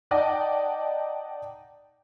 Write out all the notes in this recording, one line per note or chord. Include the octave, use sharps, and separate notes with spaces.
D#4 D5 D#5 F#5 G5 A5